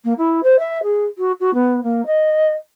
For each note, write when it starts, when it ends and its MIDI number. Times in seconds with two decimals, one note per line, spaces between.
0.04 0.13 58
0.17 0.40 64
0.43 0.58 72
0.58 0.81 76
0.82 1.04 68
1.17 1.31 66
1.40 1.53 66
1.53 1.83 59
1.83 2.04 58
2.06 2.51 75